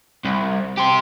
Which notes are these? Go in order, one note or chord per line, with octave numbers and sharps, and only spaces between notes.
C2
G4 C5